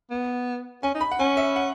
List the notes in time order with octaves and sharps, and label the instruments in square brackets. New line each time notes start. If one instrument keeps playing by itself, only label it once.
[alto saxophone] B3
[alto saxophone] C#4 [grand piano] G#5
[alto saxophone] D#4
[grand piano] B5
F#5
[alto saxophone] C#4 [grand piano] G#5
[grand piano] E5
F#5